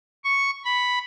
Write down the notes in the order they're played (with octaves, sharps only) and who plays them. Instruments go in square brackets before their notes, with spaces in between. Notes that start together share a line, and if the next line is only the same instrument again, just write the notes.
[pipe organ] C#6
B5